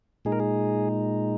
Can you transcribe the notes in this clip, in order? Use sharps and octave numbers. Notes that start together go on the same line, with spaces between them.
A#2 G#3 D#4 G#4
A#4
G#4